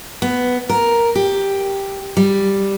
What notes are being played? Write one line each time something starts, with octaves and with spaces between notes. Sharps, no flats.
B3
A#4
G4
G3